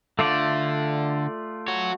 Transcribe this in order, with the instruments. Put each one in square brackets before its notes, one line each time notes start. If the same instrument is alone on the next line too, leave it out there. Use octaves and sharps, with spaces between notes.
[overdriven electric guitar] D3 [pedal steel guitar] A3 F4 D5
[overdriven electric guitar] F#4 C#5